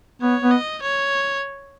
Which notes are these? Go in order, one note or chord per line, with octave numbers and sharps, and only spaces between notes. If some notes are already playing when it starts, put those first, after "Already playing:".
B3 C#5
B3
D#5
C#5